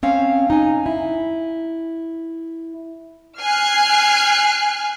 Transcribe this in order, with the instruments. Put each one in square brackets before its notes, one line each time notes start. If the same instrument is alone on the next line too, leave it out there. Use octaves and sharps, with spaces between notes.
[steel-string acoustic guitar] C4 C#4 F5
D#4 G#5
E4
[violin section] G#5 F6 F#6 G#6 C7